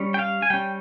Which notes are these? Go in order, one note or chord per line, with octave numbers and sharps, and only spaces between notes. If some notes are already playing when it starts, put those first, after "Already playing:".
Already playing: G3 C#4
G5
F5
G#5
G3 C#4 G5